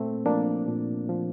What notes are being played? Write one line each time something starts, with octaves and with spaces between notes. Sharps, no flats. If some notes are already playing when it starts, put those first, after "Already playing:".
Already playing: A#2 A3 C4
F3 A#3 D4
A#2
F3